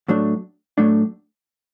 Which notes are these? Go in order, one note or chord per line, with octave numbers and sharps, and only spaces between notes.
A2 F#3 A3 D4
A2 F#3 A3 D4